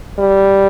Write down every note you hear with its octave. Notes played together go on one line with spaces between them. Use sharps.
G3